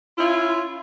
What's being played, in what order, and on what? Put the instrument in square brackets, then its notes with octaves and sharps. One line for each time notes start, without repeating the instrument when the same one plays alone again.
[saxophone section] C#4 E4 F4